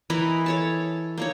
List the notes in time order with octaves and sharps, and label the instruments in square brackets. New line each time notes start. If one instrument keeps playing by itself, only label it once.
[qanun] E3 E4 A#4 D#5
A4 C#5 A5
A#3 D#4 C#5